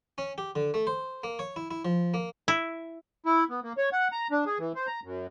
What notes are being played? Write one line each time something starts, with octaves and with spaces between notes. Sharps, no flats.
C#4
G4
D3
A3
C5
A#3
C#5
E4
E4
F3
A#3
E4
E4
B3
A#3
C#5
F#5
A#5
D4
G#4
E3
C5
A#5
F#2